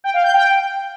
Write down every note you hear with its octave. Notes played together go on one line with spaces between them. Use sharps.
G5
F5
G6
G5